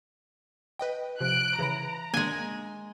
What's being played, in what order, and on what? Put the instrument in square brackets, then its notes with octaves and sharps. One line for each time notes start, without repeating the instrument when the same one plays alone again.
[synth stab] B4 D#5 G5
[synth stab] C3 F3 [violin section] F#6 D7
[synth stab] C#3 E3 B5 [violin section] A#5
[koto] G#3 G#5 [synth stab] A#3 D4